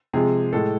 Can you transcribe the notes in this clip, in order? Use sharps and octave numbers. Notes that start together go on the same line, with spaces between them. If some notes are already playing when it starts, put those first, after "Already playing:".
C3 F3 G#3 G#4
A2 G#3 A4